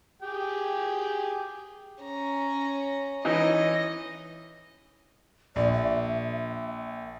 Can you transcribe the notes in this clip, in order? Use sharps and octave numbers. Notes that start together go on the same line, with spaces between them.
G4 G#4 G5
C#4 A#5
E3 C#4 D#4 D#5
A#1 D5
E5